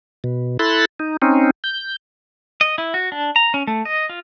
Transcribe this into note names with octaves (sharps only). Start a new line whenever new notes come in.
B2
E4 A4 B5 C6 F#6 A6
D#4
C4 C#4 D#4
G6
D#5
E4
F#4
D4
A#5
C#4
A3
D#5
F4